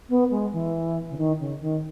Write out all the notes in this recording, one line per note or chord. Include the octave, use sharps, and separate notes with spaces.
B3
G#3
E3
C#3
D#3
C#3
D#3